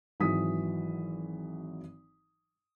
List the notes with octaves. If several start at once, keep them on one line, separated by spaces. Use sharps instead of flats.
G#1 E3 F#3 D#6 B6